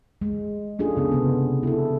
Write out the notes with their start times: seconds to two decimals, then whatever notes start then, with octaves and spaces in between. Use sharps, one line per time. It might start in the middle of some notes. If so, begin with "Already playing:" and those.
0.22 G#3
0.79 C#4 D4 F4 G#4 A4
0.97 C#3 B3
1.12 C3 B3
1.63 E4 A4